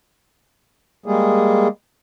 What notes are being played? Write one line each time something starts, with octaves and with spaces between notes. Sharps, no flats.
G3 G#3 A#3 G#4